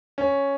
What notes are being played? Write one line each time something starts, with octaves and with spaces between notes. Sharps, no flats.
C#4